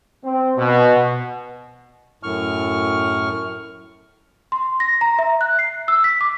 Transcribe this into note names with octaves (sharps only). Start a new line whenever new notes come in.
C4
B2
F#2 A2 C#6 F6
C6
A#6
A#5
E5
F#6
C7
E6
B6
D6